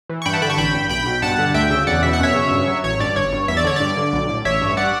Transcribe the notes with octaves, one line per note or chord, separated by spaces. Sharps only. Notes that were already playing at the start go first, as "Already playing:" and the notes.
E3
C#6
G2 G5 B5
F#5 A5
D3 G5 B5
A5 C#6
A1 G5 B5
G2
B1 G5 B5
B2
G2 F#5 A5
D3
D2 E5 G5
C#3
E2 D5 F#5
B2 E5
F#5
F#2 C#5 E5
C#3
G2
F#3
A1 C#5
G2 D5
G1 C#5
G2
E2 E5
D5
D3 C#5
G2 D5
D3
B1
A2
A1 C#5 E5
G2
D5 F#5